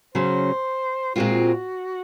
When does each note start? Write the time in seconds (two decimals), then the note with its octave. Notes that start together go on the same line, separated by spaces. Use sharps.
0.15 C#3 F#3 C#4 C5
1.15 A#2 G#3 C4 F4 F#4